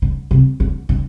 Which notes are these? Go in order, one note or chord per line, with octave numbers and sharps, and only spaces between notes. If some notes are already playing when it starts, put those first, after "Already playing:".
D3
C3
D3
D3